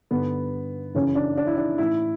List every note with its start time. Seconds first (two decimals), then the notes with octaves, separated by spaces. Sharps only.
0.11 G2 D3 B3
0.94 F#2 C#3 E3 C#4
1.15 D4
1.37 D4
1.47 E4
1.57 D4
1.78 A2 E3 E4